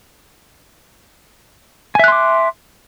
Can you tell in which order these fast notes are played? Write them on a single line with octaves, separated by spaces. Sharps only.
G#5 E5 F#6 C6 D6